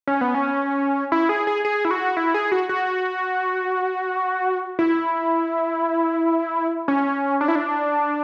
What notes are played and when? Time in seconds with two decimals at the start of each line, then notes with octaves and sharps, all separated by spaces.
0.07 C#4
0.21 B3
0.35 C#4
1.12 E4
1.29 G#4
1.47 G#4
1.65 G#4
1.85 E4
1.91 F#4
2.17 E4
2.34 G#4
2.52 F#4
2.69 F#4
4.79 E4
6.88 C#4
7.41 D4
7.48 E4
7.55 D4